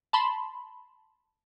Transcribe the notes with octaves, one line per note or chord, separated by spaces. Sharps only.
A5 B5 C6